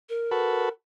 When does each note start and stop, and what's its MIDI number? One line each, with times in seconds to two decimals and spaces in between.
0.09 0.69 70
0.31 0.69 66
0.31 0.69 69
0.31 0.69 71